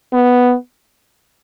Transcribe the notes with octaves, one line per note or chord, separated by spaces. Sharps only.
B3